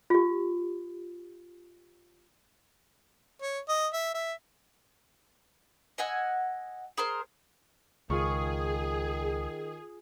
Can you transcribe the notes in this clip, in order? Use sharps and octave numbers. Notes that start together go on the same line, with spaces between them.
F4 G4
C#5
D#5
E5
E5
D#5 F#5 G#5 E6
G#4 A#4 C5
C#2 D#3 F4 G#4 C#6